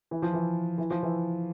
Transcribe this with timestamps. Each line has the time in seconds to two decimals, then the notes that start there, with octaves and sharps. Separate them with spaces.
0.11 E3
0.22 F3
0.33 E3
0.78 E3
0.91 F3
1.03 E3